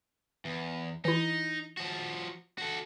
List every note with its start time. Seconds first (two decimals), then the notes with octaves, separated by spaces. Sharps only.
0.45 E2
1.05 E3 D#4 E4
1.77 F3 F#4
2.58 F#4 A4